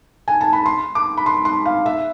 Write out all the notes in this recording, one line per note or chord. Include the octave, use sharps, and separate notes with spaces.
G#5
A5
B5
C6
D6
B5
C6
C6
F5
E5